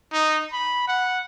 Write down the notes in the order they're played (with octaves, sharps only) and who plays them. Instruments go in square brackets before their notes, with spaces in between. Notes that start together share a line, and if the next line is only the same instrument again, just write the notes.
[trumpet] D#4
B5
F#5